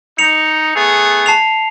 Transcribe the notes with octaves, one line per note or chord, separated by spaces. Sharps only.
D#4 C#7 F7
A3 B3 G#4
A5 C7 F7